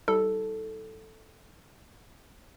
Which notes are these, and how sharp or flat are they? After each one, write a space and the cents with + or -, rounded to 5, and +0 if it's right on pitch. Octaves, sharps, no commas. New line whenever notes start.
G3 -20 E4 -40 A4 +0